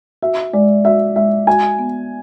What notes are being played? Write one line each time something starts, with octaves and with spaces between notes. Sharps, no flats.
F#4 E5
G#3 D5
F#4 E5
G#3 E5
F#4 G#5
B3